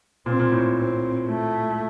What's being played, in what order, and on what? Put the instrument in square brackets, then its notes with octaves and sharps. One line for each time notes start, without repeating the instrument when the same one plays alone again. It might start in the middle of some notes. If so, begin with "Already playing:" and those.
[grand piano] A#2 [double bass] C4
[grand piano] A#2
A2
[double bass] C4
A3